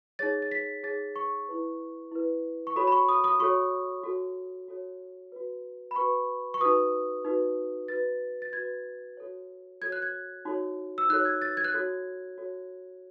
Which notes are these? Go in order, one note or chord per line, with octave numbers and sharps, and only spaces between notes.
D#4 G#4 C#5 A6
A6
B6
D#4 G#4 C#5 A6
C#6
E4 B4
E4 B4
C#6
F#4 A4 C#5 B5
B5
C#6
D#6
D#6
F#4 A4 C#5 C#6
F#4 A4 C#5
F#4 A4 C#5
F#4 B4
B5
F#4 B4 C#6
C#6
D#4 F#4 B4 D#6
D#4 F#4 B4
F#4 B4 A6
A6
F#4 B4 G#6
F#4 A4 C#5
F#4 A4 C#5 G#6
F#6
G#6
D#4 F#4 A4 C#5
E6
D#4 F#4 A4 C#5 F#6
G#6
A6
G#6
F#6
F#4 A4 C#5 G#6
F#4 A4 C#5